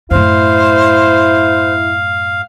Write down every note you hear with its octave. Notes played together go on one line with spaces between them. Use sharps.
F#2 A2 E4 C5 F5